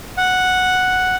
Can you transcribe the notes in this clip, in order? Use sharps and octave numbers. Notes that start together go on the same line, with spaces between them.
F#5